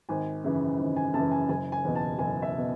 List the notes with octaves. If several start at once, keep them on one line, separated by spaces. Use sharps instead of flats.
G#1 G#5
F#2 C#3 E3
G#1
G#5
F#2 C#3 E3 A5
G#5
F#1 G#5
G#5
E2 B2
A5
F#1 G#5
E5
B2